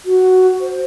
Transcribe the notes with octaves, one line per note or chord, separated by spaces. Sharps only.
F#4
C5